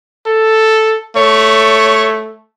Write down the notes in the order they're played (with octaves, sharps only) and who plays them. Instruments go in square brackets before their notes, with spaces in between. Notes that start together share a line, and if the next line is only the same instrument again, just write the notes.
[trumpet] A4
[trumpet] A3 [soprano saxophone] C#5